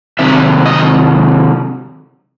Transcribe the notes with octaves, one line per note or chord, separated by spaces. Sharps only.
C3 D#3 F#3 E5
D#5